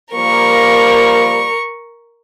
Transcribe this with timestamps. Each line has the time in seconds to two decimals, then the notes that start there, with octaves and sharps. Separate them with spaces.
0.15 F3 G3 A#3 A#4 C#6